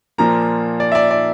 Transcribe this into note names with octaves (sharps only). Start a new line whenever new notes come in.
A#2 F3 A#3 A#5
D5
E5
D5
D5